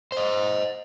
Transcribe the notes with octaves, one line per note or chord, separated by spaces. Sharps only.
C5 D#5